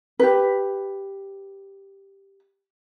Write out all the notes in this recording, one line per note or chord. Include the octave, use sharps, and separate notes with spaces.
G4 B4